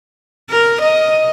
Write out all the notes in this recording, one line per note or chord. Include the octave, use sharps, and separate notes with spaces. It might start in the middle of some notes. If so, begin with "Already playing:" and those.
A#4
D#5